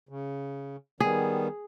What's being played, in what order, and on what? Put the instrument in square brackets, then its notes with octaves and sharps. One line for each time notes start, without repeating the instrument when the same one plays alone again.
[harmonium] C#3
[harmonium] D#3 G3 B3 [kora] G#4